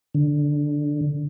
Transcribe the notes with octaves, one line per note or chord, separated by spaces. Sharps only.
D3